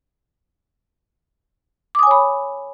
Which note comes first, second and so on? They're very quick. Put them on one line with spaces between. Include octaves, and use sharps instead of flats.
D6 D#6 G#5 C#5 B5